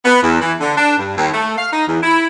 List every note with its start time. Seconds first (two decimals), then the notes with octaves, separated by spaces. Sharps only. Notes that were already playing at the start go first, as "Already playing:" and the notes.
0.05 B3
0.23 E2
0.41 E3
0.60 D3
0.77 D4
0.98 G2
1.17 D#2
1.33 A3
1.57 F5
1.72 D#4
1.87 E2
2.02 E4